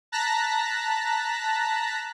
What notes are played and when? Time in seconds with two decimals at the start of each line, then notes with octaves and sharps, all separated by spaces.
0.12 A5 A#5 F#6 A#6 B6